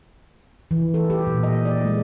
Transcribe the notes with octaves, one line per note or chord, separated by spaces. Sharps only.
E3
A4
G4
A#2
D#5
D5
G#3